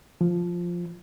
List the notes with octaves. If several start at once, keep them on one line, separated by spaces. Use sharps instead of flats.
F3